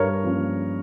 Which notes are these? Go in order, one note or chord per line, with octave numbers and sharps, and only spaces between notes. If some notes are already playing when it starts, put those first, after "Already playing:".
Already playing: G2 A#4 C#5
F3 A#3 C#4